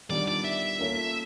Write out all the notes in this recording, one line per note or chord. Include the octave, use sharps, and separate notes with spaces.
D#3 G3 B3 D4 F4 D5
D5
E5
A#3 C#4 F4 A4 C#5